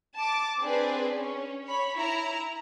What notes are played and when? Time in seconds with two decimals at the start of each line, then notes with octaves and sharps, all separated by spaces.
0.17 A5 D6
0.61 C4 D4 G#4 B4
1.15 C#4
1.66 C#5 B5
1.96 E4 A#5